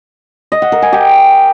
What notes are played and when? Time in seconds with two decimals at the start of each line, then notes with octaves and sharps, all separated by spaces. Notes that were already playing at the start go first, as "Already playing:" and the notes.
0.52 D#5
0.62 F#5
0.72 A#4
0.82 G#5
0.92 G4